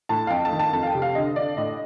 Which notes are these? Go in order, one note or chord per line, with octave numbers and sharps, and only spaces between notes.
A2 A5
F5
F2 G5
A5
D#3
A5
F2 A5
F5
G5
C3
F5
D3 D#5
D3 D5
A2 D#5